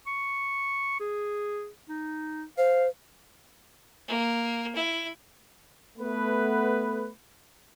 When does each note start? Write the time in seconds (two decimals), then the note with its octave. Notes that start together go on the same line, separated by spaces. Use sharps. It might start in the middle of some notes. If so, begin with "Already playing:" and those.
0.07 C#6
1.00 G#4
1.89 D#4
2.58 C5 F5
4.08 A#3
4.75 E4
5.98 A3 B3 B4